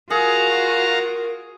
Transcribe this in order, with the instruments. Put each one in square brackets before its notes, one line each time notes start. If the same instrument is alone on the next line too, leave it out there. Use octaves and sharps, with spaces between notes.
[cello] F4 F#4 [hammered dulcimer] G#4 [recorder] A#4 [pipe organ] F5 F#5 A#5